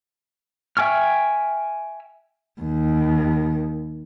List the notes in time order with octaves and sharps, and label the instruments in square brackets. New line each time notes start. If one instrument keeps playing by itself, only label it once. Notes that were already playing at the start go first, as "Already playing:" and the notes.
[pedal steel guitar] E5 G5 G#5 C#6 F6
[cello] D#2